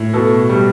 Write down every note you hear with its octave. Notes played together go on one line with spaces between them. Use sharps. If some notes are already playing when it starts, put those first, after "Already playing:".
Already playing: A2
B2 A4
G3